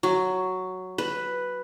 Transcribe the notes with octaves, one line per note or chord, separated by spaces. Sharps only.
F#3
B4